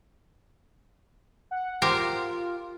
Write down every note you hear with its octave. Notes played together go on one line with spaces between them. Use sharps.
F#5
F4 G4 A#4 C5